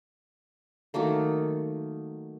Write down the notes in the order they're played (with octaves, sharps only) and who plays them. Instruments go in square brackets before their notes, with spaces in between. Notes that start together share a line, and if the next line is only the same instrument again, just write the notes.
[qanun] D#3 F#3 A3 A#3